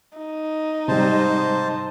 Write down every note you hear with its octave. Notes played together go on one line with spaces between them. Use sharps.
D#4
G#2 C3 G3 C5 A5